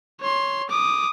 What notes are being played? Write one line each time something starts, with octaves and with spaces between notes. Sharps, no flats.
C#5 C6
D6 D#6